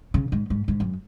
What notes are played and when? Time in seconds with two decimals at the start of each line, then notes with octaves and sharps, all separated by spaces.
0.14 C#3
0.32 G#2
0.50 G#2
0.68 G#2
0.80 F#2